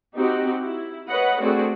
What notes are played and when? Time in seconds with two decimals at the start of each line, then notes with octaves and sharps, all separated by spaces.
0.15 C4 D#4 F#4 G4
0.61 E4
1.09 B4 C#5 D#5 F#5 B5
1.40 A3 C4 D4 F#4 G#4 A4